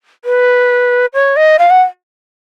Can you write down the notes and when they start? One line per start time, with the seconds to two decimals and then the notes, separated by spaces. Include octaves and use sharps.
0.25 B4
1.14 C#5
1.36 D#5
1.59 F5
1.70 F#5